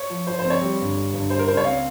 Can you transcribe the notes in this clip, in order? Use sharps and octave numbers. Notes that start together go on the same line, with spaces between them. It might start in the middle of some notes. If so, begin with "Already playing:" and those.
Already playing: C#5
F3
F3 C5
C5
C4 C#5
G3
G1
G3
G1
G3 C5
A#4
C#2 C5
C#5
C4 F5